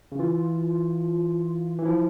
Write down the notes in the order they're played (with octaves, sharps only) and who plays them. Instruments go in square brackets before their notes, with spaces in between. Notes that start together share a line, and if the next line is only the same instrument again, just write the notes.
[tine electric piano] C#3
[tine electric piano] E3 [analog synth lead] F4
[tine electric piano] E3
[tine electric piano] F3 [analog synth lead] E4